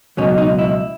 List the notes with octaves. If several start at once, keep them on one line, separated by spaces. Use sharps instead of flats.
C#2 B2 F#3 C#4
D#4
E4